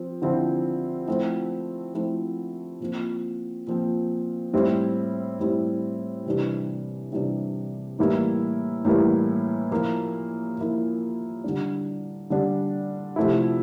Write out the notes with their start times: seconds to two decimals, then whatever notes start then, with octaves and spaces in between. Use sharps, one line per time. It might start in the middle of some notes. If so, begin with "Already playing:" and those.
Already playing: F3 C4
0.22 D3 F3 C4 E4
1.08 F3 A3 C4 E4
1.94 F3 A3 C4 E4
2.80 A#2 F3 C4
3.67 A#2 F3 C4
4.53 A2 G3 C4 E4
5.39 A2 G3 C4 E4
6.26 C3 E3 G3 D4
7.12 C3 E3 G3 D4
7.99 A2 E3 G3 A#3 E4
8.85 A2 E3 G3 A#3 E4
9.71 A#2 F3 A#3 E4
10.57 A#2 F3 A#3 E4
11.44 D3 G3 D4
12.30 D3 G3 D4
13.16 C3 F3 A3 E4